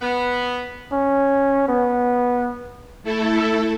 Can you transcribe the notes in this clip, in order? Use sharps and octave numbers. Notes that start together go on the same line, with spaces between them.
B3
C#4
B3
A3 E4 A4